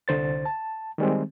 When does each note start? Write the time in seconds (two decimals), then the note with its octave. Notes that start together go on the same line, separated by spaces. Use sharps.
0.08 C2 D3 C5 A6
0.46 A5
0.98 D#3 G3 G#3 C4